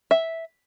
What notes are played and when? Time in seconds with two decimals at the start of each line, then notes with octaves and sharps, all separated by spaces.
0.11 E5